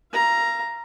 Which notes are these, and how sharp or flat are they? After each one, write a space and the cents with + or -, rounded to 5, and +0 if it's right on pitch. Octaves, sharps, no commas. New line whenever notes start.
F5 -35 A#5 +5